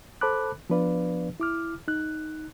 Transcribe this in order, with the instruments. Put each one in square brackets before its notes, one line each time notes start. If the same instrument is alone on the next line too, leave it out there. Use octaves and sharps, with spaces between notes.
[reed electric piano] A4 C5 A5 B5 D6 F#6
F3 B3 D4 B4 D5 F5
E4 D6 F6
D#4 F#6